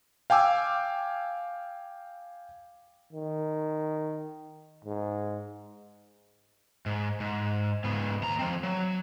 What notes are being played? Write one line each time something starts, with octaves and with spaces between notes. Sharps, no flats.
F5 G5 G#5 D6 E6
D#3
G#2
G#2
G#2
G#2 B3
D#2 A#5
F3 C4
F#3